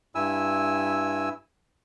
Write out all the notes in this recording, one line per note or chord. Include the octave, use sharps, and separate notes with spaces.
G2 E4 G#5 E6